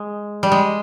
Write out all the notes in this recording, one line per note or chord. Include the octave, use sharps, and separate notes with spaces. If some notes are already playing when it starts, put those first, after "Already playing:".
Already playing: G#3
G3
G#3